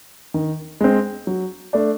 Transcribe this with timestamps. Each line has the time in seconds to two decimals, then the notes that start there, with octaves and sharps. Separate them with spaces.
0.34 D#3
0.81 G#3 C4
1.27 F#3
1.73 A3 D4